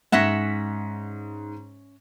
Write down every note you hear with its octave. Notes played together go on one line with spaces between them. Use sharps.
G#2 C#4 E5 F#5 A#6 B6